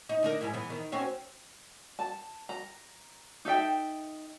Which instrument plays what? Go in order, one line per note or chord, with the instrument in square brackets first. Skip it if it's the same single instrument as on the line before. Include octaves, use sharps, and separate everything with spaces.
[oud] D#4
D3 D#4 A#4
G#2 G3 E4
E3 B3
D#3
C4 C#4 F#4
[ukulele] A5
A#5
D#4 A4 E5 G5